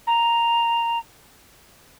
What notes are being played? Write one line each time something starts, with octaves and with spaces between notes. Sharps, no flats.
A#5